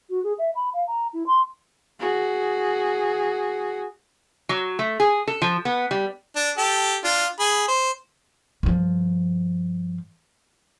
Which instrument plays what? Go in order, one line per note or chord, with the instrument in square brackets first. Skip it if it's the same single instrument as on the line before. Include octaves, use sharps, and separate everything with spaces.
[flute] F#4
G#4
E5
B5
F5
A#5
E4
C6
[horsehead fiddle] F#4 G#4
[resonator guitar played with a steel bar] F#3
A3
G#4
A4
F3
B3
G3
[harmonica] D4
G4 A4
D4 F4
G#4 B5
C5
[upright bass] G2 F3